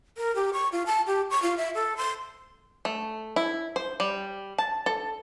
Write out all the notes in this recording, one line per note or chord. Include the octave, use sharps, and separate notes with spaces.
A#4
G4
C#6
F4
A5
G4
C#6
F4
E5
A4
C6
A3
E4
C5
G3
A5
A4